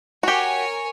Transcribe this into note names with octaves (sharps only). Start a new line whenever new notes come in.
F#4 G4 A#4 C#5 G#5